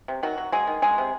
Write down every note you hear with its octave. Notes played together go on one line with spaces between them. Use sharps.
C3
D#3 F#3 F#4
F#3
F#3 G#3 G#4
D#3
F#3 G#3 G#4
C3